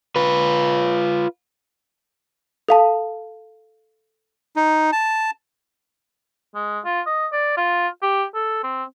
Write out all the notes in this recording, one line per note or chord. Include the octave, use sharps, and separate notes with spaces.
F4 B4
A4 F5 A5
D#4
A5
G#3
F4
D#5
D5
F4
G4
A4
C4